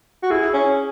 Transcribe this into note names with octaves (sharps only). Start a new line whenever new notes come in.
F#4
E4 G#4
C#4